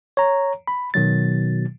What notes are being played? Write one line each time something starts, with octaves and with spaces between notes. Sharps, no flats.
C#5 A#5
B5
B2 D#3 F#3 A6